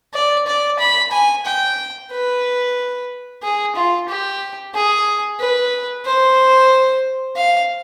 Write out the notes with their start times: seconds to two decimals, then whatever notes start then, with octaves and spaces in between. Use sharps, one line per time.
0.14 D5
0.47 D5
0.79 B5
1.12 G#5
1.45 G5
2.11 B4
3.42 G#4
3.76 F4
4.09 G4
4.74 G#4
5.40 B4
6.05 C5
7.36 F5